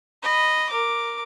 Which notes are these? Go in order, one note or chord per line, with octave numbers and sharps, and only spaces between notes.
D#5 B5
A#4 D6